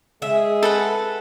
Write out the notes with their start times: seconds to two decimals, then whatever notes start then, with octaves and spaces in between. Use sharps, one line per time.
0.22 G#3 G#4 E5
0.63 A4 B4 F#5